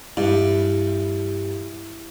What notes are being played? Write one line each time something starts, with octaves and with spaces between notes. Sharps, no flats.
G2 E4